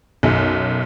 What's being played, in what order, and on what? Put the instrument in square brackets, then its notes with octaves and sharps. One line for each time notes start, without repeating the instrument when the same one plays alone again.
[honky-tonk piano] B1 F#2